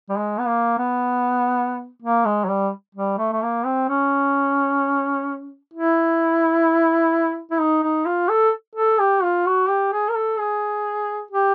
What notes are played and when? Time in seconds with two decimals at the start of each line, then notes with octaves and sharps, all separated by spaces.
0.09 G3
0.17 G#3
0.39 B3
0.47 A#3
0.78 B3
2.02 A#3
2.25 G#3
2.45 F#3
2.49 G3
2.95 G3
3.18 A3
3.33 A3
3.42 A#3
3.65 C4
3.89 C#4
5.74 E4
7.51 E4
7.59 D#4
7.83 D#4
8.06 F4
8.29 A4
8.75 A4
8.99 G4
9.23 F4
9.46 F#4
9.69 G4
9.93 G#4
10.09 A#4
10.15 A4
10.39 G#4
11.31 G4